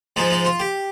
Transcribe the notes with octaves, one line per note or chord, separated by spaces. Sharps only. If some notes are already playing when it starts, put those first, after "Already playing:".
G#2 F3 G#3 D#4
D#4
F4
G4